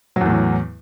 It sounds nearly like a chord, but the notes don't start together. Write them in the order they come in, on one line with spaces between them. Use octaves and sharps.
F#3 E2 A2 E3